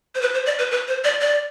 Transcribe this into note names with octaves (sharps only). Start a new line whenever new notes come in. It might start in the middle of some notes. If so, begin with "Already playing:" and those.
C5
B4
C5
D5
B4
B4
C5
D5
D5